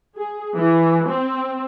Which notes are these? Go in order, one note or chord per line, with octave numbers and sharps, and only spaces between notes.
G#4
E3
C4